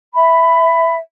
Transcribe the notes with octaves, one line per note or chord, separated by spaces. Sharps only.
E5 B5